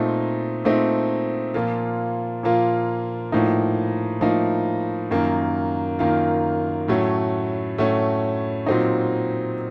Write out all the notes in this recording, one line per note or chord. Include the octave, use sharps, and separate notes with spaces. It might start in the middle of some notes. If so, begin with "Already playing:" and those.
Already playing: A#2 A3 C4 D#4
A#2 A3 C4 D#4
A#2 F3 A#3 F4
A#2 F3 A#3 F4
A2 F3 A#3 D#4
A2 F3 A#3 D#4
F#2 D#3 A#3 F4
F#2 D#3 A#3 F4
A2 F#3 A3 C#4
A2 F#3 A3 C#4
A#2 F#3 C4 D#4